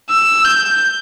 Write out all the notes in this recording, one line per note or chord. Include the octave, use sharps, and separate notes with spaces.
E6
G6